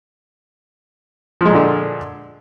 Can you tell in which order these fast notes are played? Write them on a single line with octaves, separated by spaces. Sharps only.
F3 G#3 A#2 D3